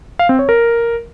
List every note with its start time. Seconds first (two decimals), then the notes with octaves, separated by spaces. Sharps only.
0.19 F5
0.29 C4
0.39 C#5
0.49 A#4